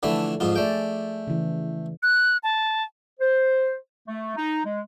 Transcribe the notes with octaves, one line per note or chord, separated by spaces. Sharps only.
D3 E3 F3 A3 A4 D5
F2 G#2 F4
A3 G#4 D5 G5
C#3 E3
F#6
A5
C5
A3
D#4
G#3